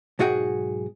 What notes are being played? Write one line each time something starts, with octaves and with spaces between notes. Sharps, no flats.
B1 G#2 F#4 G#4 F#5 G5